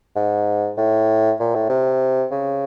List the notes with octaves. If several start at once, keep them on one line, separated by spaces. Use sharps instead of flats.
G#2
A2
A#2
A2
C3
C#3